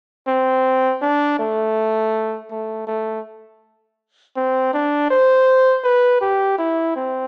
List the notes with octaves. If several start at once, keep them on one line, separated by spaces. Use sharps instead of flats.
C4
D4
A3
A3
A3
C4
D4
C5
B4
G4
E4
C4